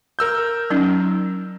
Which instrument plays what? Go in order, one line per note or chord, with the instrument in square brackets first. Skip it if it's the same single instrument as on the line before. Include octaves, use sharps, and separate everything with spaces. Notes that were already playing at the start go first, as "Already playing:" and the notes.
[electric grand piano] A#4 E6 G6
[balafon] F#3 C#4 D#4